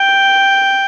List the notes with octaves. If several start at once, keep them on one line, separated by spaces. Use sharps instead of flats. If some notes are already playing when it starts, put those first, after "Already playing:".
Already playing: G5